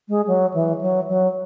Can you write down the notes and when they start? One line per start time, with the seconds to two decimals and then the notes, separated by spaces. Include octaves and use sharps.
0.09 G#3
0.27 F#3
0.54 E3
0.81 F#3
1.08 F#3